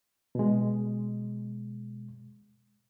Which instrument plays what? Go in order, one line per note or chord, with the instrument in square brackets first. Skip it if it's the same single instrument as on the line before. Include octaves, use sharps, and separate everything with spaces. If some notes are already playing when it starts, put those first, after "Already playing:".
[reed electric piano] B2 G#3